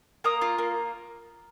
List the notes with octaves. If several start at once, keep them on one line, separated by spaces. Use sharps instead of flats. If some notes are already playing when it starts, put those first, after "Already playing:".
A#3 A#5 D#6
F4
A#3